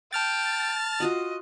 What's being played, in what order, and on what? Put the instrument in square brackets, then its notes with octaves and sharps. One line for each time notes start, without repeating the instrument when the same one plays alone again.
[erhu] G5 [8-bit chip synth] A5 F6 A6
[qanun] F4 F#4 F#5 [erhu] D#5